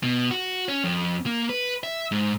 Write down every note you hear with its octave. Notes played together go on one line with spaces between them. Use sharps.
B2
F#4
C#4
F2
A#3
B4
E5
G#2